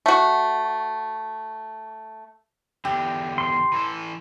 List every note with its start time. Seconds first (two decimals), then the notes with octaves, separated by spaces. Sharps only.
0.06 A3 F#4
2.85 E2 D3 G4
3.38 C6
3.72 E3 A4